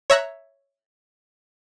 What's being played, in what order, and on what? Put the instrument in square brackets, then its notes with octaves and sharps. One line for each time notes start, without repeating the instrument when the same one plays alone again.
[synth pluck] C#5 E5 A#5 F#6